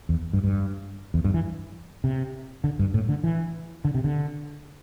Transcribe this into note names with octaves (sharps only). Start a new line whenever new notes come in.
E2
G2
G2
E2
G2
E3
C3
D3
G2
A2
D3
E3
D3
C3
D3